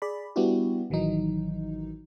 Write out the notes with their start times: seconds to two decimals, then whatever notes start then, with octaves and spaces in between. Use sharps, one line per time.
0.02 G#4 D5 B5
0.36 G3 B3 D4 E4 F#4 G4
0.90 A1 D#3 E3 F#3 D#4